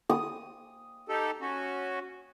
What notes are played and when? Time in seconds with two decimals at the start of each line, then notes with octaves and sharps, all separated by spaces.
0.09 D#6
1.09 D#4 G4 A4
1.41 C#4 F#4